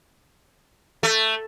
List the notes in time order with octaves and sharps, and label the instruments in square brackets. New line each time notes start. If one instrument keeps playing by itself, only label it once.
[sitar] A3